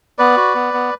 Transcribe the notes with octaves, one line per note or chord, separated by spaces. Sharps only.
B3 B4 D5
F#4
B3
B3